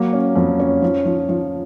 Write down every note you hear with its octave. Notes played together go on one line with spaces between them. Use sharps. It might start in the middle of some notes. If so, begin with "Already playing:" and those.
Already playing: F#3 A#3
C#4
F2
C#4
F3
F3
F3